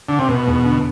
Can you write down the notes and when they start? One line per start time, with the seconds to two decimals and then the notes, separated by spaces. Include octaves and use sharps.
0.09 D3
0.19 C3
0.29 B2 B3
0.47 E2
0.64 D3